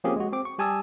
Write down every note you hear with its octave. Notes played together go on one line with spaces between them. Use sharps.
F3 A#3 C4 C#4 G4 G#4
G#3 F#4
C4 D6
C#6
G3 G4 G#5 A5 D#6 E6